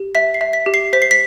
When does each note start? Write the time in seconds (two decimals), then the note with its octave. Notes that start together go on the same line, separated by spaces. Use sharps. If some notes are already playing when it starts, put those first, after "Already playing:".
Already playing: G4
0.15 E5 B6
0.34 C7
0.41 E5
0.53 B6
0.66 G4
0.74 C7
0.93 C5 B6
1.02 C7
1.11 B6